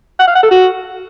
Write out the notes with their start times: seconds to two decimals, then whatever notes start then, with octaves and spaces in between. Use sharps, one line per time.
0.20 F#5
0.27 F5
0.35 F#5
0.43 A4
0.51 F#4